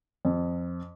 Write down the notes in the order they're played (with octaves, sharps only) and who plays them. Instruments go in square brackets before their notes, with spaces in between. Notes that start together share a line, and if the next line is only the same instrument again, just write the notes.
[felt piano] F2